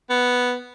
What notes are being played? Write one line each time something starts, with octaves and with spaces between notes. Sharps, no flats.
B3